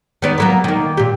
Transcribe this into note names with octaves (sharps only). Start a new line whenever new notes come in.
D#3 B3 D5
F#3 A#3 B3
D#3 A#3
A#2 G4